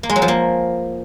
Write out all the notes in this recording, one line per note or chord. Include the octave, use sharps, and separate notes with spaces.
A#3
G#3
F#3
F3
A#3